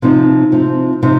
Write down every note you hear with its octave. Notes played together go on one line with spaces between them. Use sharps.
C3 F3 C4 D#4
C3 F3 C4 D#4
C3 F3 C4 D#4